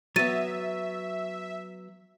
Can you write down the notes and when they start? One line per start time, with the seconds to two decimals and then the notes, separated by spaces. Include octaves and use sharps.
0.16 F#3 B3 E5 A6 D#7